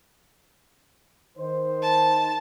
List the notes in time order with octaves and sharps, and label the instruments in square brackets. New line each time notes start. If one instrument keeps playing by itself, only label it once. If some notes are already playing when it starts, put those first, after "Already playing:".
[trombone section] D#3 C5
[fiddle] A5